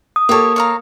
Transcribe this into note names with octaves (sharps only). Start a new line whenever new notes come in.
D#6
A#3 G4 A4 C#5
C#5 F5 A#5